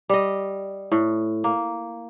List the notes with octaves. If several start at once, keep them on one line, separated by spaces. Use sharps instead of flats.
G3 D#5
A2
A#3